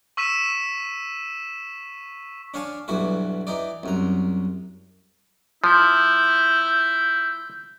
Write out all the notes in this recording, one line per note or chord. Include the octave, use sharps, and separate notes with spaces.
C#6 E6 B6 D#7 E7
D4 C#5 F5 G#5 A5
B1 G2 E3 F#4 B4
E3 D#4 D5
C2 F#2 A#5
F3 E4 G6